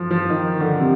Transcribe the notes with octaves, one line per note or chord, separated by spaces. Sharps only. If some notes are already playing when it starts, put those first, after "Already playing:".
Already playing: F3
F3
D#3
D3
C3